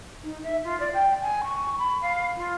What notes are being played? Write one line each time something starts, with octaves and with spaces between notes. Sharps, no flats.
D#4
E5
F4
D5
G5
G#5
C#6
B5
F5
F4